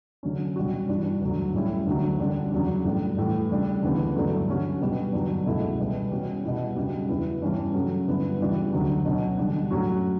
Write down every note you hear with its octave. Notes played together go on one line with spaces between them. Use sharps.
D3 F#3 C#4
B2 G3 C#4 F#4
G2 E3 G3 D4
D2 D3 F#3
A2 G3 C#4 E4
D2 D3 F#3
F#2 D3 G3 D4
E2 C#3 F#3
A2 G3 D4
A2 E3 G3
C#3 G3 D4
D2 C#3 E3 B3
G2 D3 F#3 A3 E4
D3 F#3 C#4 F#4
B2 G3 B3 D4 F#4
G2 D3 F#3
C#2 B2 A3 E4
B2 G3 B3
B2 G3 C#4 F#4
B2 G3 B3 E4
F#2 C#3 G3 D4 F#4
E2 C#3 E3 B3 E4
G2 E3 G3 C#4
C#3 F#3 A3 C#4
G2 D3 G3 B3 E4
C#3 E3 G3 D4 F#4
D2 D3 F#3
B2 F#3 C#4
D3 G3 D4
A2 F#3 C#4 F#4